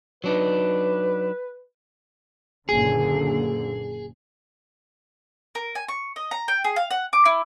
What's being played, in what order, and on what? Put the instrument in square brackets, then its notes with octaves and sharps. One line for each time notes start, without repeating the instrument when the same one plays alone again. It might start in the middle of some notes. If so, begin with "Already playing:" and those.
[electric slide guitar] F#3 D4 D#4 [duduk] B4
[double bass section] F#1 A#2 D3 [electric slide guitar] G#4
[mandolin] A#4
G#5
C#6
D#5
A#5
G5
G#4
F5
F#5
D6
E4